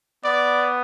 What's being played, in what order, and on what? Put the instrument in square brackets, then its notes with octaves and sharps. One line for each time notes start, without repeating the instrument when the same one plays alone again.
[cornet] B3 [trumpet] D5